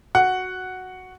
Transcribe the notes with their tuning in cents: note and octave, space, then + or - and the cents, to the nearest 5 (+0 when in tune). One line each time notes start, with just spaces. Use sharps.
F#4 +0 F#5 +0